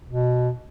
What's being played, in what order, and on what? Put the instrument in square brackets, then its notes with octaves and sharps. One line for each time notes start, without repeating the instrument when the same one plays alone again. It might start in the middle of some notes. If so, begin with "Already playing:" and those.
[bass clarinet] B2